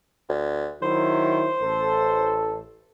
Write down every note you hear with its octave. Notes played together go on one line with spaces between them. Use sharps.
D2
D#3 F#3 E4 C5
A1 A4